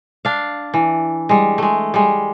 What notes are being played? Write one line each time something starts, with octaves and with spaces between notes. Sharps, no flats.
D4 F5
E3
G3 G#3
G#3 A3
G3 G#3